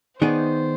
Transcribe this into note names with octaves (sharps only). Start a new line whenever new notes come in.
D#3 B3 D#4 G#4 C5 D5